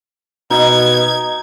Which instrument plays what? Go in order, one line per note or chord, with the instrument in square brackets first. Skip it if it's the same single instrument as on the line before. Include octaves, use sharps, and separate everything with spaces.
[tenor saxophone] B2 [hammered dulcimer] D#4 [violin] G#6